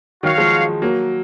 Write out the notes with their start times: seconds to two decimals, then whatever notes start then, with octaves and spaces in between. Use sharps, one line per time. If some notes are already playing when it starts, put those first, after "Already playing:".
0.23 D#3 F#3 F#4 C#5 F5
0.38 F3 G#3
0.82 F#3 A#3